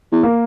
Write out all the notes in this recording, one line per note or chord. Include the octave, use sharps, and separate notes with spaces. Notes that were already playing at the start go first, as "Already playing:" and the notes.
E2
A#3